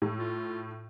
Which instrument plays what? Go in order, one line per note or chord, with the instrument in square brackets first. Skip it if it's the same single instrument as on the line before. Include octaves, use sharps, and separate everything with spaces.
[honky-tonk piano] A2
[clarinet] F4